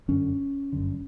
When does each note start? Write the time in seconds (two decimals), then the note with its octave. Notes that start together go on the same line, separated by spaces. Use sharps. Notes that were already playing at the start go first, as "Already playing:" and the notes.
0.08 G1 F#2 D3 C#4
0.73 G1 F#2 D3